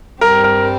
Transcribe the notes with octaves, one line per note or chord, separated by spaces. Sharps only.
G2 G3 C4 G4 A#4
A#4